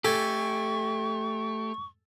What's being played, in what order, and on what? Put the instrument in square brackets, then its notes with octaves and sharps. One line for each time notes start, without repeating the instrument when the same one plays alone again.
[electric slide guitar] A3 G4 [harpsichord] A4 G#5 [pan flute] C#6